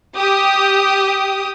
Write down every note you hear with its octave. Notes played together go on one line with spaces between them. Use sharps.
G4 D#6